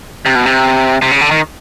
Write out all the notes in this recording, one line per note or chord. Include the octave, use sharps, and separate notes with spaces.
C3
B2
C3
C3
C#3
D3
D#3